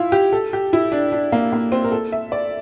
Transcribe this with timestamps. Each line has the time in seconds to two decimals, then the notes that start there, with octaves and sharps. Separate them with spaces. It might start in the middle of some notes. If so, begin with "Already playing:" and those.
Already playing: E4 F4
0.12 G4
0.32 A4
0.53 G4
0.73 E4
0.92 D4
1.12 D4
1.32 A#3
1.53 A#3
1.72 C4
1.84 A#4
1.92 A4
2.12 E5
2.32 D5